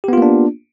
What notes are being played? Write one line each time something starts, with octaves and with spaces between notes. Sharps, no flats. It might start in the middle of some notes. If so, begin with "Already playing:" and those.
A#3 B3 D4 F4 G4